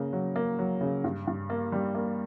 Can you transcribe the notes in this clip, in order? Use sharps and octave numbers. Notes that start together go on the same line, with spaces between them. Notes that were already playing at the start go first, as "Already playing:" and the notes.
Already playing: C#3 A#3
F#3
A#3
F#3
C#3
G2
G2
A#3
G3
A#3